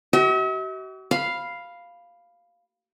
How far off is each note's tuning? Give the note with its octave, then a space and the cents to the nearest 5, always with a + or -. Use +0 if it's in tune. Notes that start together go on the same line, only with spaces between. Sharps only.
F#4 +45 E5 -45
F5 +0 B5 +0